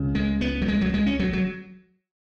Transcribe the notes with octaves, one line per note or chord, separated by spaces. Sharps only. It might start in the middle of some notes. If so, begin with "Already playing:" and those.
Already playing: C#2 C#3
G#3
B3
F#3
G#3
F#3
G#3
C#4
F#3
F#3